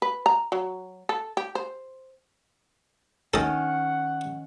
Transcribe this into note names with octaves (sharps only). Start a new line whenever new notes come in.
B4
A#5
F#3
A4
G4
C5
D#3 C#4 A4 D#5 F#5